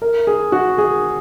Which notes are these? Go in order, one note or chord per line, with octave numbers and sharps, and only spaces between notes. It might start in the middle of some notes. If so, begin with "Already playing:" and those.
A#4
G#4
F#4
G#4